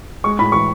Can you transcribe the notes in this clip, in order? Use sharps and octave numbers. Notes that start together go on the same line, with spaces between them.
G#3 C#6
A2 B5
E3 C#6